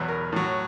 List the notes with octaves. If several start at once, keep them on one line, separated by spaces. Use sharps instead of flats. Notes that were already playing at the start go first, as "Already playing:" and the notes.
Already playing: E2 B2 F#3 B4
A#4
A2 F#3